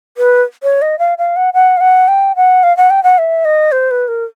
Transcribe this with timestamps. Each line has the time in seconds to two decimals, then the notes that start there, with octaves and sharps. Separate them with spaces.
0.17 B4
0.63 C#5
0.82 D#5
0.99 F5
1.18 F5
1.36 F#5
1.54 F#5
1.77 F5
1.81 F#5
2.08 G5
2.36 F#5
2.63 F5
2.77 F#5
2.90 G5
3.03 F#5
3.18 E5
3.45 D#5
3.72 C5
3.91 B4
4.08 A#4